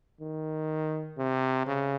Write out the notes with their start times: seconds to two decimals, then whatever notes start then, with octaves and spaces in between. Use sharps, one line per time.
0.21 D#3
1.18 C3
1.67 C#3